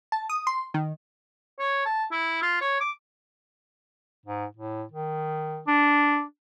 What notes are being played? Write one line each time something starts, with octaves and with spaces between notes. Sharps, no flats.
A5
D#6
C6
D#3
C#5
A5
E4
F4
C#5
D6
G#2
A2
D#3
D4